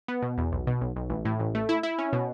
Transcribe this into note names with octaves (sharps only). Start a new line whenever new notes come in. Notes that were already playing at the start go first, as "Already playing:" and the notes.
B3
B2
E2
B1
B2
B1
B1
A1
A2
A1
A3
E4
E4
C#4
B2